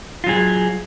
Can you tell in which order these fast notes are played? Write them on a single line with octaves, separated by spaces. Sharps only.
F4 F#3 G#4